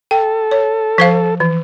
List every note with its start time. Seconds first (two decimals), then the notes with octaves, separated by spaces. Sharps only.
0.11 A4 G5
0.51 C#5
0.98 F3 C5 F5
1.40 E3